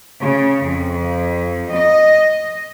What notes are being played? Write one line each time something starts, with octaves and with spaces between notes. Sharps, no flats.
C#3
F2
D#5